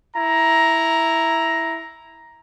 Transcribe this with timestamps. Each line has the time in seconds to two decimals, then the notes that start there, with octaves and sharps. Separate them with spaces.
0.15 E4 A#5